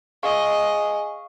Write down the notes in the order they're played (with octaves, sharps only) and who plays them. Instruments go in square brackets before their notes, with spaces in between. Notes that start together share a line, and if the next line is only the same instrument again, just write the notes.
[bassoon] G#4 [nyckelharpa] D#5 [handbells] F5 C#6